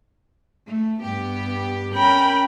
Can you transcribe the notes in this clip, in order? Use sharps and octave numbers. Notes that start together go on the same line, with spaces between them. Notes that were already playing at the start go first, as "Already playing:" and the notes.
A3
G2 B3 G4
C#4 A#4 G5 B5